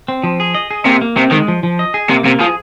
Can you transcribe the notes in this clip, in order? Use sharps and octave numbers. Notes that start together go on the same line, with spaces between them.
C4
F3
G#4
D#5
G#4
C3 A#3
A#3
C3 C4
D#3 G#3
F3
F3
D#5
G#4
C3 A#3
C3 A#3
F3 G#4